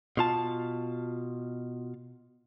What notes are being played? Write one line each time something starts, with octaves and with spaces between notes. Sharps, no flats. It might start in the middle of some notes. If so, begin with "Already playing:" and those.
B2 F4 A5